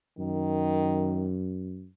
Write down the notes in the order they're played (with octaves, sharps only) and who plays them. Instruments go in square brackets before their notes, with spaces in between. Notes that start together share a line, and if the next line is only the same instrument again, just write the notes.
[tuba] F#2 [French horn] D#3